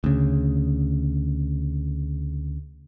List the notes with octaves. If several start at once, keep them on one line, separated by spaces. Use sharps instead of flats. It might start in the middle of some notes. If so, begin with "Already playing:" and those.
D2 C#3